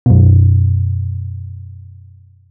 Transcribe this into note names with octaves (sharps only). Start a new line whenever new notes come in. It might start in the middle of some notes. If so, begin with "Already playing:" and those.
F#2 B2